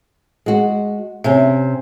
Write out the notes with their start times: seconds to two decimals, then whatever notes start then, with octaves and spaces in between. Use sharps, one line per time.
0.46 G#3 F#4
1.24 C3 C#4 E5